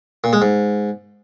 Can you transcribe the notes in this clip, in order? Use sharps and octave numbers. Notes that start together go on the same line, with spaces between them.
A#2
G#3
G#2